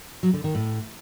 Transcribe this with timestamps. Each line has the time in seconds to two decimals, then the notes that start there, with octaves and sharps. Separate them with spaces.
0.23 F#3
0.33 D3
0.44 D#3
0.55 A2